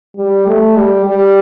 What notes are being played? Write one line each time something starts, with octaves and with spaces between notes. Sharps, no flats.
G3
A3
G3
G3